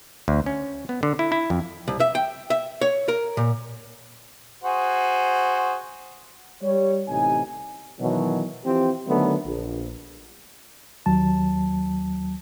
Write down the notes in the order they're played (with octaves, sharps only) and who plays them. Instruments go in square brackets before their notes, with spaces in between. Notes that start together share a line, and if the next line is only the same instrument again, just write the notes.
[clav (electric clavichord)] D2
C#4
B3
D3
E4
E4
F2
[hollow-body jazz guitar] C2
E5
G5
E5
C#5
A#4
A#2
[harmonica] F#4 G#4 C5
[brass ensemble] G3 C#5
A1 C3 D#4 G#5
[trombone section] B2 D#3 E3 F#3
E3 F3 C4 G4
D3 D#3 F#3 A3 B3
A#1
[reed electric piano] D#2 F#3 A5